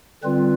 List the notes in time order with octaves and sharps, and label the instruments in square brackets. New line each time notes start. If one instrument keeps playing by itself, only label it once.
[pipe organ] D3 G3 C4 F4 B4